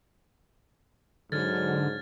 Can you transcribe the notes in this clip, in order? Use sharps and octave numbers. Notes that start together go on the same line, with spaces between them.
G#2 D3 F#3 F6 G#6 A6